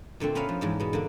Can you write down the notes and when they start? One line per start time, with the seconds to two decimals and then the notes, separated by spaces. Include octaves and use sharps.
0.20 A#2 D3 A3 C4
0.35 B3 C#4 A#4 B4 E5 F5
0.49 F3
0.61 E2 G#2 D4
0.80 B2 B3
0.93 D3 A#3 D4